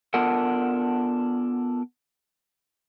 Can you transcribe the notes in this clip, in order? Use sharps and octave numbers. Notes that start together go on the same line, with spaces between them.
B3 D4 F4 A4 A#4 F#5